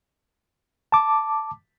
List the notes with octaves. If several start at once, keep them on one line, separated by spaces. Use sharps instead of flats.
A5 D6